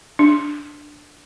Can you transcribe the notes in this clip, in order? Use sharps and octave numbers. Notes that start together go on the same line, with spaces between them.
D4